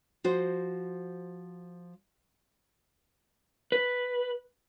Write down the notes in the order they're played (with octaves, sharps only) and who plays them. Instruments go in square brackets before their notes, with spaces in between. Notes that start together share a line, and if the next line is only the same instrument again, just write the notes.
[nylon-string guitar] F3 F#4 C5
[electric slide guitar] B4